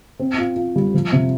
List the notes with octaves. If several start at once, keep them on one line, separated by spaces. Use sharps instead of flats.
C4
F4
F4
G3
F3
C3